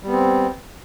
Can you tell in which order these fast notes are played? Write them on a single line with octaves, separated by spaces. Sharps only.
G3 B3 C4